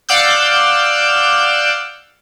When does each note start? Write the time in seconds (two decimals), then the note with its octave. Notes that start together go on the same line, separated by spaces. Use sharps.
0.09 D5 F5 F#5 D6 E6 G6